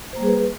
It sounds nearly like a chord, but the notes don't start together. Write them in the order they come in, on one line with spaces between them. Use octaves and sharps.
C5 A#3 G3 G#4 B4